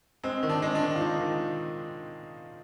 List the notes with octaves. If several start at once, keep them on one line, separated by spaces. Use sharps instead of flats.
G#3 C4
D#3
D4
G#3
D4
D#3
F4
G#3 D#4
D#3